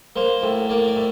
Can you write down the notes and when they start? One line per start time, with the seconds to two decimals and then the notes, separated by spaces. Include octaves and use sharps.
0.16 A#3 C5
0.42 A2
0.69 A#3 D5
0.86 D5
0.95 A2